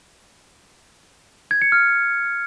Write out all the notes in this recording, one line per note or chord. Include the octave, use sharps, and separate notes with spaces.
G#6
C#7
F6